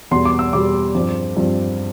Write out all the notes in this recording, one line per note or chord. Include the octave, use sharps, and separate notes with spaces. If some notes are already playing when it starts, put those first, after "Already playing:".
E2 B2 G3 C6
D6
E6
E2 B2 G3 D6
G2 F3 C4
G2 F3 C4